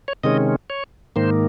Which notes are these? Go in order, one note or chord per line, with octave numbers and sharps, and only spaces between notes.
C#5
C3 D#3 G#3 C#4 D#5
C#5
G#2 D#3 A#3 C5